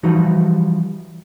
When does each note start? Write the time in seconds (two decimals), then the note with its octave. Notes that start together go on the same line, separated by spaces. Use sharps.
0.03 E3 F3 G3 D#4 F#4